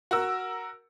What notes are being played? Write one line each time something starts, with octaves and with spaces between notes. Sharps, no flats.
F#4 A#4 E6